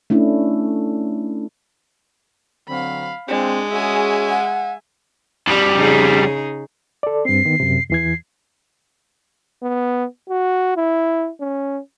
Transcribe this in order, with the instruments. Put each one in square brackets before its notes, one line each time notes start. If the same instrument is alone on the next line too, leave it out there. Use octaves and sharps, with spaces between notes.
[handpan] A3 C#4 D4 E4
[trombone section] D3 F#3 C4 [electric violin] F5 B5
[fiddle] G#3 [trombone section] C4 F4 [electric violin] D4
[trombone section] C#4 F#4 G#4 [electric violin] E5 G#5
[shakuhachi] F#5
[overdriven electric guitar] F2 G3
[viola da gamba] C#3 D#4 G#4
[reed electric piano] A4 D5
[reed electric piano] G2 C4 [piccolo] C7
[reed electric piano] D#3 B3
F#2 C3
[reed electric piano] E2 E3 G#6 [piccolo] C7
[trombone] B3
F#4
E4
C#4